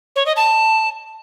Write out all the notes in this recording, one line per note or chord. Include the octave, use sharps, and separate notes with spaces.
C#5
D#5
A5